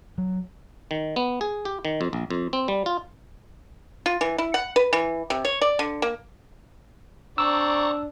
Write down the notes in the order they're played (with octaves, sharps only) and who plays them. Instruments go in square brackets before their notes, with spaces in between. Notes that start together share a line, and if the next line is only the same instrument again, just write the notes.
[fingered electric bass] F#3
[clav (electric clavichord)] D#3
B3
G#4
G4
D#3
F2
A#1
F2
C4
G3
F4
[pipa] F4
E3
E4
F#5
B4
E3
C3
C#5
D5
D3
A#3
[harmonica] C4 D5 [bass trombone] D4 [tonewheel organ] A#5 C#6 [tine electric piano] E6